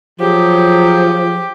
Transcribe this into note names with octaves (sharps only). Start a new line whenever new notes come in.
F3 F#3 G4 G#4